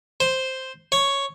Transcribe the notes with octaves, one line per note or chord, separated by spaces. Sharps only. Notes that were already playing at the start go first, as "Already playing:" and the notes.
C5
C#5